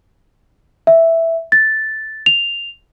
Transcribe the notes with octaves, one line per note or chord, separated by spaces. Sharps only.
E5
A6
F7